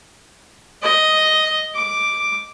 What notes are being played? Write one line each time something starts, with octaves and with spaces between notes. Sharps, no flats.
D#5
D6